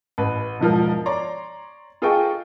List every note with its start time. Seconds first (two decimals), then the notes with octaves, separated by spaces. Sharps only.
0.18 A1 B4
0.60 E1 G#2 F3 A#4
1.06 C#5 D5 A#5 C6
2.02 F4 G#4 A4 D#5 G5 C#6